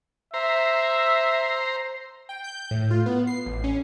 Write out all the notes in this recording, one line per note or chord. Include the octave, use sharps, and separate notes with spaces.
C5 E5 A#5
G5
G6
A2
F4
B3
C7
A1
C#4